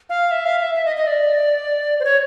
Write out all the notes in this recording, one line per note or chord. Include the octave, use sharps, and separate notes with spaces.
F5
E5
F5
E5
E5
D#5
D#5
D5
C5
C#5